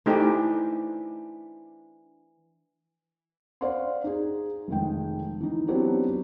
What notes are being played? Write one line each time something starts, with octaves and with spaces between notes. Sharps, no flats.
E3 A3 D4 D#4 G4 C5
C5 D5 F5 F#5 C6
D#4 G#4
F1 D#3 G#3 G5
E3 D#4
F#3 B3 C4 D4 E4 G4